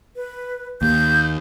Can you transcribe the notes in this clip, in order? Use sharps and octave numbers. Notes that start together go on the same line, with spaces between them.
B4
D#2 G6